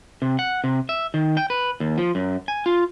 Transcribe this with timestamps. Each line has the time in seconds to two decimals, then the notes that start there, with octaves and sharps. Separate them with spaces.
0.22 C3
0.39 F#5
0.64 C3
0.89 E5
1.14 D#3
1.37 G5
1.50 B4
1.80 D#2
1.98 F3
2.15 F#2
2.48 G#5
2.66 F4